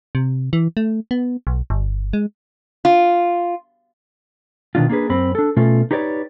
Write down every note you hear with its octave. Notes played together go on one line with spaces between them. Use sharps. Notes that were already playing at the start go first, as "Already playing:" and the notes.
C3
E3
A3
B3
B1
G1
G#3
F4
B2 D#3 D4 F4
A#3 D4 G#4 B4
F#2 C4 B5
D4 A4
B2 A3 C#4 F4 A4
D#4 G4 B4 C#5 D5